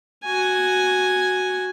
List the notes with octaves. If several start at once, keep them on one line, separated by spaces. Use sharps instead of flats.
F#4 G#5